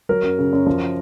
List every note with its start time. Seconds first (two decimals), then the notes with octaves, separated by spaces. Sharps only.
0.09 F#3 A#4
0.23 F#2
0.39 C#3
0.53 F#2
0.66 F3